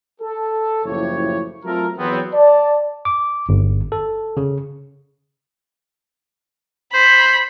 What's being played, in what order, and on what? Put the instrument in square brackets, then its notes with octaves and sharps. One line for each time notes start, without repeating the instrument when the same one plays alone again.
[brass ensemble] A4
F#1 A2 F3 E4 G4 C#5
F#3 A3 C4 F4 A4 A#4
E2 F#3 B3 C4
D5 A5
[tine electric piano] D6
G1
A4
C#3
[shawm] C5 [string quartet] B5